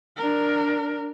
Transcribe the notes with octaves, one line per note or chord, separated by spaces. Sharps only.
D4 A#4